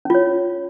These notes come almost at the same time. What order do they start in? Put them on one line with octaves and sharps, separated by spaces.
C#4 F4 C#5